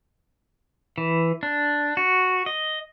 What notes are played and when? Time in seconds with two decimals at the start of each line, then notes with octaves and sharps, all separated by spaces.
0.98 E3
1.43 D4
1.97 F#4
2.46 D#5